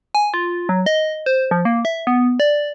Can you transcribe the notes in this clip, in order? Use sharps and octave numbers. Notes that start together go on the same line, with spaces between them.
G#5
F4
F#3
D#5
C5
F3
A#3
E5
B3
D5